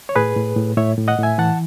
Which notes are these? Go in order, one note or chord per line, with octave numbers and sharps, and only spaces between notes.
C#5
A2 G#4 B4
A2
A2
A2 C#5 E5
A2
D#5 F#5
A2 E5 G#5
E3 F#5 A5